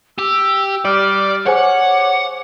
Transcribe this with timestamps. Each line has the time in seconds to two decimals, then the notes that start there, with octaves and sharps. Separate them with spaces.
0.18 G4 E6
0.85 G3 D5 F6
1.46 G#4 C5 C#5 F#5 G#5 D6